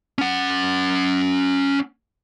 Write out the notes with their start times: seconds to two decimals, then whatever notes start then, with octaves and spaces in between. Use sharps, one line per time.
0.19 C#4 F#5